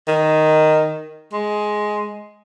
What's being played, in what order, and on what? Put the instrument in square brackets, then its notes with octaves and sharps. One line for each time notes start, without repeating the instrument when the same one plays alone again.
[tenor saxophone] D#3
G#3